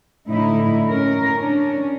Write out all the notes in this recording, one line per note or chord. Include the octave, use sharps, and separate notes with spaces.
A2 D3 D#4 E4
C#4 A#4
C#4 D4